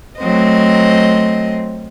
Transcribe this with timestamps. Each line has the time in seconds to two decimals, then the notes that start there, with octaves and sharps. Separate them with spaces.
0.19 F#3 A3 C4 C5 D#5